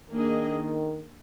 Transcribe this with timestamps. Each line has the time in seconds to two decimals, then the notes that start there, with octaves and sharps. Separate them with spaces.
0.11 D#3 A#3 D4 G#4 D#5